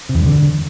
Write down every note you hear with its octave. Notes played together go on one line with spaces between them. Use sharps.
C3
E2
G2
D3